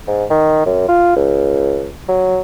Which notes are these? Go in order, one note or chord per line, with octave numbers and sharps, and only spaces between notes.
G#2
D#3
F#2
F4
C#2
F#3